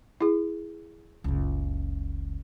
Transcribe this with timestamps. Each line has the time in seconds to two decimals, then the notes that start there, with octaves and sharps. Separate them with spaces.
0.21 E4 G#4
1.24 F#1 C#2